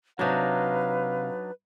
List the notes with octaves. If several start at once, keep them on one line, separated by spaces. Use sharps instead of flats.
C3 F#3 D4 D#4 B4 C#5 F5